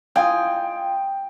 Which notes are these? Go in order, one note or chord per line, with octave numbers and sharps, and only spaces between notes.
F4 D#5 G5 G#5